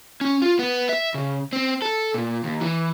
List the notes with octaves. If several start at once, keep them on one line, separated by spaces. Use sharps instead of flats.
C#4
F4
B3
E5
C#3
C4
A4
A#2
D#2
E3